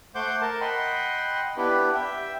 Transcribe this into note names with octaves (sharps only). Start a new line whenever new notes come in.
A3 C5 F#5 C6 D6 G6
A#4 A5
D#5 F#5 G5 B5 C6
B3 D4 E4 G4 B4
E5 G5